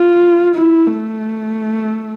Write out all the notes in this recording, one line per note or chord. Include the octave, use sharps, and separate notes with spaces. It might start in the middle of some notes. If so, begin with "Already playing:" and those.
Already playing: F4
E4
A3